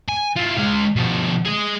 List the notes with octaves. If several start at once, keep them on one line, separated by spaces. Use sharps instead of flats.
G#5
E4 F4
G#3 F5
B2 F3
G#4 D#5